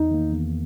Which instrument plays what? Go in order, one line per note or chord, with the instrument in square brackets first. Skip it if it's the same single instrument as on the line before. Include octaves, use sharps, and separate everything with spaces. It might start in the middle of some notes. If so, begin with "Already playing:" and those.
Already playing: [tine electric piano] E2 [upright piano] D#4
[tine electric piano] D#3 A#3
E2